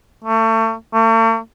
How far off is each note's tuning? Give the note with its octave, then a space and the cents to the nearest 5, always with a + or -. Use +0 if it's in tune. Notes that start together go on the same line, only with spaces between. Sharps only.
A3 +30
A3 +45